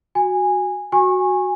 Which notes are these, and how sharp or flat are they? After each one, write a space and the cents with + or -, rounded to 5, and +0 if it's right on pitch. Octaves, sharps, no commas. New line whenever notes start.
F#4 +0 G#5 -15
F#4 +0 G#5 -10 C#6 -30